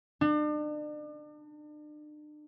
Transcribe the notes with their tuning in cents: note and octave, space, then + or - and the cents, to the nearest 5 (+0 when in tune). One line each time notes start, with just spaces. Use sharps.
D4 +40